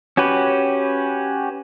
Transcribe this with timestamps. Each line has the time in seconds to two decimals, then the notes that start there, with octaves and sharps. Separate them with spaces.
0.17 C#4 F#4 G4 B4